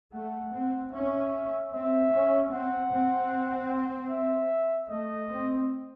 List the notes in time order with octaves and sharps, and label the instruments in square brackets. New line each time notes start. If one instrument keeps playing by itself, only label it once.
[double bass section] A3 [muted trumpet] F#5
[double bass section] C4
[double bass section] C#4 [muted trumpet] E5
[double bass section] C4 [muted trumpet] E5
[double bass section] C#4
[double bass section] C4 [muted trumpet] F#5
[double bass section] C4
[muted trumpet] E5
[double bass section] A3 [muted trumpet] D#5
[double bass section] C4